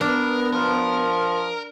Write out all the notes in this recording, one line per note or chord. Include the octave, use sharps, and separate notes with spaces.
B3 D4 A#4
F3 A#4